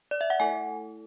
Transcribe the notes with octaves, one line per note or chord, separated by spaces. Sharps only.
D5
E5
F#5
A3 E4 A4 G#5